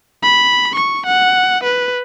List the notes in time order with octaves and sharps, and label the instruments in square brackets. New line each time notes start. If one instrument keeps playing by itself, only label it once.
[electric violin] B5
C#6
F#5
B4